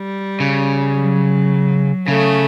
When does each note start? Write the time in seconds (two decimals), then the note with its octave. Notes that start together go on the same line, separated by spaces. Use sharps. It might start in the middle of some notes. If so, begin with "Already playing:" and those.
Already playing: G3
0.40 C#3
0.96 F#3
2.08 C#3 A3